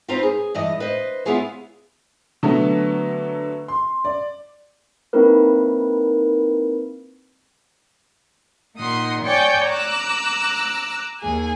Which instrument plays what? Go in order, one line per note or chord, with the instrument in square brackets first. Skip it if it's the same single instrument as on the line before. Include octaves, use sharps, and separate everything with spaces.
[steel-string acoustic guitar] C4 D#4 F4 B4 C5 A#5
G#4
G2 E3 D#5
B4 C5 D#5
B3 E4 F4 G#4 C#5
[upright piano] D3 F#3 A3 B3
C6
D5
[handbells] A#3 C4 D#4 E4 A#4 B4
[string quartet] A#2 D#3 D#4 F#5 C6 D#6
C#5 D5 G5 G#5 C#6 D6
A#5 D6 E6 F#6
D#2 G#4 G#5